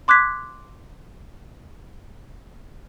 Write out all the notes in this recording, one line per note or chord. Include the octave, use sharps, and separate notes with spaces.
C6 D6 F#6 G#6 B6